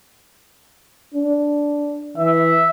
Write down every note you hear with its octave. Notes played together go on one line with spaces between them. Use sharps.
D4
E3 E5